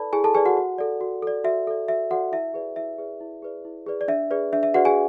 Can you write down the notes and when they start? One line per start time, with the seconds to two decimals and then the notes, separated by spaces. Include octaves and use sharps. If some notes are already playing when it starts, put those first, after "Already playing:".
Already playing: E4 A4 B4 D5 A5 B5
0.13 E4 G#4 G#5
0.24 A4 A5
0.34 G#4 B4 D5 G#5
0.46 F#4 F#5
0.57 F#4
0.78 A4 D5
1.01 F#4
1.23 A4 D5
1.44 F#4 E5
1.67 A4 D5
1.88 F#4 E5
2.11 F#4 A4 D5 F#5
2.32 E4 E5
2.54 G#4 B4 D5
2.76 E4 E5
2.98 G#4 B4 D5
3.21 E4
3.42 G#4 B4 D5
3.65 E4
3.86 G#4 B4 D5
4.01 D5
4.08 D4 E5
4.31 G#4 B4 D5
4.53 D4 E5
4.63 E5
4.74 F#4 G#4 B4 D5 F#5
4.85 G#4 G#5